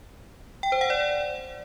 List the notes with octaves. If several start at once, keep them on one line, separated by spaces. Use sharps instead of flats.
G5
C5
F#5
D5